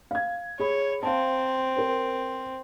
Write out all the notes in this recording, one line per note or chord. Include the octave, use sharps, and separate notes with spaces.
F5 G#6
G#4 C#5 B5
C4 F5 A5
A#4 C5